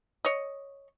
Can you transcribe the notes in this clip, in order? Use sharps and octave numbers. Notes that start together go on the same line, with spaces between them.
C#5 D#5